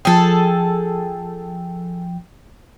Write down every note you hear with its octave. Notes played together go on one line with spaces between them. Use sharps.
F3 G#4 A4 G5